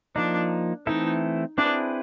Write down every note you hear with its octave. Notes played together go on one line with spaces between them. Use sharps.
F3 A#3 D4 D#4
E3 A3 C4 D#4 E4 A4
C4 D4 E4 G#4 B4